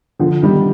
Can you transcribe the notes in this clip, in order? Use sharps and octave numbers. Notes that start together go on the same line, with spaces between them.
D3 F3
D#3 G3